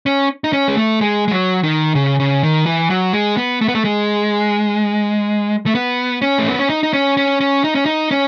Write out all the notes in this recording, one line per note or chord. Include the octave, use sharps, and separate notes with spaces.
C#4
D#4
C#4
G#3
A3
G#3
G#3
F#3
D#3
C#3
C#3
D#3
E3
F#3
G#3
B3
A3
B3
A3
G#3
A3
B3
C#4
A3
B3
C#4
D#4
D#4
C#4
C#4
C#4
D#4
C#4
D#4
C#4